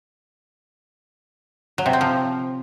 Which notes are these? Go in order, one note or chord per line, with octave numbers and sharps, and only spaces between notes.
F#3
C3
C4
F3